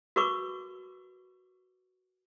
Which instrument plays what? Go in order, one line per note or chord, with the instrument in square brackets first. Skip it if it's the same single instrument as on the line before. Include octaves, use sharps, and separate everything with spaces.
[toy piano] F#4 A#4 B4 C#6 D6